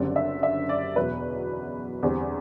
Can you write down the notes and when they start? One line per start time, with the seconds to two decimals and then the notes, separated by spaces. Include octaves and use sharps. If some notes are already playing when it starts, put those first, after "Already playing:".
Already playing: F#1 F#2 D3 G3 C4 D5
0.16 E5
0.43 E5
0.69 D5
0.96 E2 B2 F#3 B4
2.03 E2 D3 G3 C4